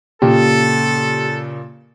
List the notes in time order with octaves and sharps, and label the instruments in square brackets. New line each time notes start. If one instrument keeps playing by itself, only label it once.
[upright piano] A#2 C#3 [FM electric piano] G4 [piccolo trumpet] A4